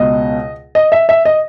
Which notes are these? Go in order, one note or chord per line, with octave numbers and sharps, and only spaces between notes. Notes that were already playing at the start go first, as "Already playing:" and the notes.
Already playing: C#2 B2 D#5
D#5
E5
E5
D#5